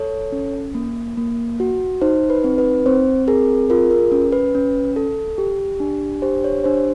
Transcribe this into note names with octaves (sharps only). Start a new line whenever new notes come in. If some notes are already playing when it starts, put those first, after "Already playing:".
Already playing: A4 C#5
C#4
A#3
A#3
F#4
D#4 C5
B4
C4
B4
C4 C5
G#4 A#4
F4 A#4
A#4
C#4
B4
C#4
A4
G4
D4
G4 C5
C#5
D4 C5